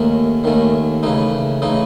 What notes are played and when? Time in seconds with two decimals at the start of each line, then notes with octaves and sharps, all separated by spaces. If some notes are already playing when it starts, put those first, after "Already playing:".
Already playing: D#2 D#3 A3 C#4
0.44 D#2 D#3 A3 C#4
1.03 C#3 E3 A3 D#4
1.62 C#3 E3 A3 D#4